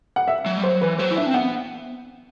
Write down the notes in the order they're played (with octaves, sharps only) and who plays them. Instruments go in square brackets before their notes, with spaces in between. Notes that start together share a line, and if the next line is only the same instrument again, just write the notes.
[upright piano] F#5
E5
[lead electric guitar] F#3
G3
[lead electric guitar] F#3 [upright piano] C5
[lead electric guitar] E3 [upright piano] B4
[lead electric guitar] F#3 [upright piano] C5
[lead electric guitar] E4
[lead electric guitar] D4 [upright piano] E5
[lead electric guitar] C4
[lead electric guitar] B3 [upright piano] F#5